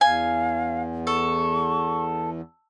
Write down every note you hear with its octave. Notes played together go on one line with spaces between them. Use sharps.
E2 F5 G#5
A4 C#6